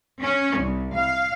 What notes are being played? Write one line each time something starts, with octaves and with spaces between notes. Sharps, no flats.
C#4
C2
F5